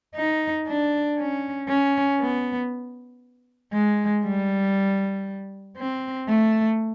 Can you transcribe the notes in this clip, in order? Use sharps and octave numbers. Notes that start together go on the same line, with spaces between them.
D#4
D4
C#4
C#4
B3
G#3
G3
C4
A3